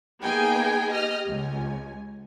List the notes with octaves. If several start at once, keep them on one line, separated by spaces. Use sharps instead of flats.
A#3 B3 D#4 G#4 G5 G#5
G4 D#5 F6
C#2 G#5